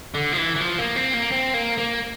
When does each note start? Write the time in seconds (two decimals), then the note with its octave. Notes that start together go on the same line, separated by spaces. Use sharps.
0.14 D3
0.33 F3
0.38 E3
0.56 E3
0.61 F3
0.79 A#3
0.96 C4
1.14 A#3
1.32 C4
1.54 A#3
1.78 A#3